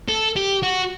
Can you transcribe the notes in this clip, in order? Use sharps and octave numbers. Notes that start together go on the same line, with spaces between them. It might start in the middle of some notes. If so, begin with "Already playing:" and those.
A4
G4
F#4